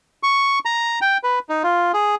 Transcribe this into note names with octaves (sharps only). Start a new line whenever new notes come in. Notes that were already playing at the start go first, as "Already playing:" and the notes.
C#6
A#5
G5
B4
D#4
F4
G#4